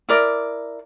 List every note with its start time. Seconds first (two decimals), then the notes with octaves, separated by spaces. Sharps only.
0.09 E4 A#4 D5